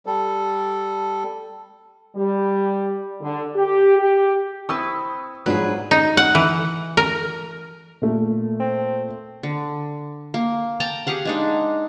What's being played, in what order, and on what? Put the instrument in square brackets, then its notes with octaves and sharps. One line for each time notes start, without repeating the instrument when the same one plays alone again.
[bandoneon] G3 A4
[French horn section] G3
D3
G4
G4
[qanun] C4 E4 B4 [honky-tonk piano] C#6 D#6 E6
[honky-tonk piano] G#2 F3 D4 [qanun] F#3 [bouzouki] G#4 B4
[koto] D#4
F#5
E3
A#4
[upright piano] A#2 A3
[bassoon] C4
[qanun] D3
A#3
G5 A5 A#5
G4 G#4 F5 F#5
G#3 D4 D#4